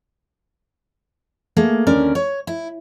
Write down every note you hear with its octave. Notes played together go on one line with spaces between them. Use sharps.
A3 A#3 G#4
D#2 D3 C#4 A#4 D5
C#5
E4